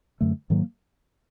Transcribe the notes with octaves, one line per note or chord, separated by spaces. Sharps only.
F#2 D3 F#3 A3
G#2 D#3 F#3 A#3